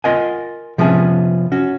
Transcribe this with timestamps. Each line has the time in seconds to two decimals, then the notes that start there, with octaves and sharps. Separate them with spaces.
0.04 F4 A#4 D#5 F#5 G#5
0.78 C3 F3 B3 C#4 G#4
1.52 C#4 F#4